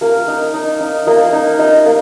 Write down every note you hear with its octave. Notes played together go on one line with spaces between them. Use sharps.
A#3 A#4
D#4
D#4
D#4
A#3 D#5
D#4
D#4 D#5
A#3